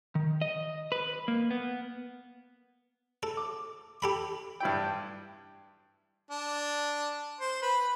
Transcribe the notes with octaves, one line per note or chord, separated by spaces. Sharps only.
D#3
D#5
B4
A#3
B3
A4
D6
G4 A4 B5
G2 E4 G5
D4
C5
B4